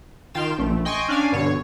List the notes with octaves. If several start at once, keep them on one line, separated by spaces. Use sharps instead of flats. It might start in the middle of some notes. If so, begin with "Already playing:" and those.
D#3 F4 F5 G5 C6 E7
A#1 A3
D#5 G5 G#5 C6 C#6
C#4 D4 D5 F5 G#5
G2 B2 D3 C#5